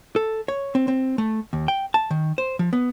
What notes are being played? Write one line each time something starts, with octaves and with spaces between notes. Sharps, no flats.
A4
C#5
C4
C4
A3
D#2
G5
A5
D#3
C5
F3
B3